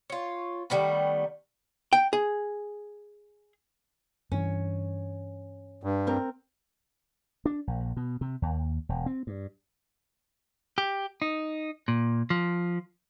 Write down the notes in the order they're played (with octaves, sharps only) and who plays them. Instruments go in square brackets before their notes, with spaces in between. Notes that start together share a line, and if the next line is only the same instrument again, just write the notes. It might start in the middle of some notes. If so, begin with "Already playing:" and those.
[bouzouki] F4 C#5
D#3 G3 A3 B3
[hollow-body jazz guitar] G5
G#4
[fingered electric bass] G2 E3 [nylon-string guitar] C#4
[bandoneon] G2
[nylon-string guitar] C4 A#4
[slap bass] D4
A#1
B2
C3
D#2
E1
C4
G2
[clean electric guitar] G4
D#4
A#2
F3